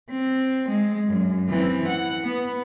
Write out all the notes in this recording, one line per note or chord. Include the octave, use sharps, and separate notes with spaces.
C4
G#3
F#2
E3 C4
F#5
B3